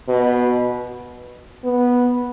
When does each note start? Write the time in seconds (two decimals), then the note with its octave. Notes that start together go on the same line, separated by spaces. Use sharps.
0.08 B2
1.64 B3